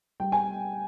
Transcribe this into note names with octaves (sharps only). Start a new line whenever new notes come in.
G3 G5
G#5